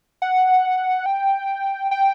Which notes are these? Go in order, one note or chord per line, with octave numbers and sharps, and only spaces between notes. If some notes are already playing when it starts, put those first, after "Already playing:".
F#5
G5
G5